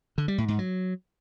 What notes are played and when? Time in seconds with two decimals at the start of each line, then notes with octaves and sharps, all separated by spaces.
0.18 D3
0.28 G3
0.38 A2
0.48 G#2
0.59 F#3